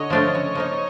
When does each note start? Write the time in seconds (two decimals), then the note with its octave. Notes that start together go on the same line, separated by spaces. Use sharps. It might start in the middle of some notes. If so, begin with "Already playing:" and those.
Already playing: D3 C#5 D#5
0.10 F3 A3 D4 F4
0.35 C#3
0.55 F3 A#3 D#4